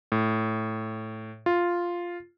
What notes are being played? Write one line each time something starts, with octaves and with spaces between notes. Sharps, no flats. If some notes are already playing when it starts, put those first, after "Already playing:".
A2
F4